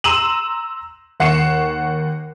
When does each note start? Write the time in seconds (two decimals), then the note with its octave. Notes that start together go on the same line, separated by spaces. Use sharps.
0.04 A#5 C6 E6 D#7 E7 F#7
1.20 D#2 F#5 C#6 C7 C#7 E7